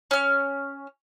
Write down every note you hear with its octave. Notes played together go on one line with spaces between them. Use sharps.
C#4 F6